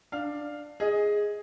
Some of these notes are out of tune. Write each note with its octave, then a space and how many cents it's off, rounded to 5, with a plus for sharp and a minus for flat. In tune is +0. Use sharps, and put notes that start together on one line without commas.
D4 +10 F5 +0
G#4 -5 D#5 +15